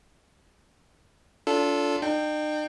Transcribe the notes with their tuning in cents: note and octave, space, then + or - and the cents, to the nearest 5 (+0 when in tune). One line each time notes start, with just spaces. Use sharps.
D4 -35 F4 +0 A4 +0
D#4 -45 G5 +0